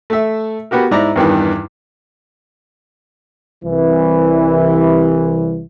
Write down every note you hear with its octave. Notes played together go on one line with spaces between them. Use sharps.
A3 E5
B3 F#4 G4 A#4
G#2 E4 D5 A#5
E2 G2 D#3 E3
C2 E3